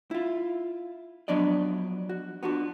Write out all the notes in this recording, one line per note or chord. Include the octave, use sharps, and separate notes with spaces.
E4 F4
F3 F#3 B3 D4 D5 D#5
F#4
B3 D4 F4 F#4